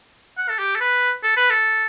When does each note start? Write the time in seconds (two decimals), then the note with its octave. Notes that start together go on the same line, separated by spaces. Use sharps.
0.37 F#5
0.49 A4
0.59 G4
0.75 A4
0.81 B4
1.23 A4
1.36 B4
1.50 A4